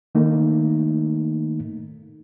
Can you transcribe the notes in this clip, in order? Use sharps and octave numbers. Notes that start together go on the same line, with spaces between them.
D#3 A3 A#3 D#4